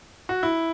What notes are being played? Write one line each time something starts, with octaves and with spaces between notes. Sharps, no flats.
F#4
E4